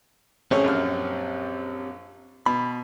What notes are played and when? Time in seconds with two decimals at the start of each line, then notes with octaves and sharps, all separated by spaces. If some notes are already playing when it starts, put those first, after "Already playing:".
0.51 A1 C4 C#4 G4 G#4 C#5
0.64 A#1 F#2 F6
2.46 B2 B5